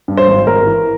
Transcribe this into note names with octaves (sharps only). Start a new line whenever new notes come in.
G2
C5
G#1
G#1 A#4
E3